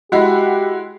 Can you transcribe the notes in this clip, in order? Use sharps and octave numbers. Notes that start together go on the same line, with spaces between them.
G#3 E4 F#4 G4 D#5 F#5 B5